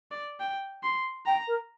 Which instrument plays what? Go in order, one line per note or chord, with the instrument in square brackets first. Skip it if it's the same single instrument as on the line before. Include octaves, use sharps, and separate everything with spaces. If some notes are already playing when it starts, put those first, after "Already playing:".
[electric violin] D5
G5
C6
[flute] G5 [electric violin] A#5
[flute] A#4